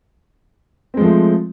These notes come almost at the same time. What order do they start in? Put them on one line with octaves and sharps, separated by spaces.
C4 G#3 F3 A3